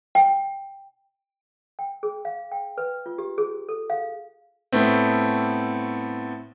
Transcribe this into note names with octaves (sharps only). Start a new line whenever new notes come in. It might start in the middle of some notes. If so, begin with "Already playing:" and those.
G5
G5
G#4
F5
G5
B4
F4
G4
G#4
A4
F5
A2 A3 B3 C4